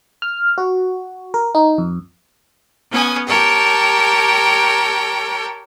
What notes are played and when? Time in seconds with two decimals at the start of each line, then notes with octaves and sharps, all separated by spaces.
0.22 F6
0.58 F#4
1.34 A#4
1.55 D#4
1.78 F2
2.91 B3 C#4 G#5 D#6
3.27 G4 A#4 C#5 G5 A5